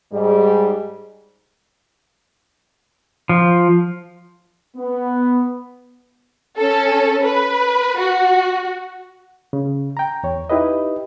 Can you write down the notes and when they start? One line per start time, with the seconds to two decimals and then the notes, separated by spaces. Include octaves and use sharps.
0.12 G#2 G3 G#4
3.29 F3
4.77 B3
6.58 C#4 A4
7.25 B4
7.97 F#4
9.53 C#3
9.97 G5 A#5
10.23 E2 C#5
10.50 D#4 E4 G4 B4 D#5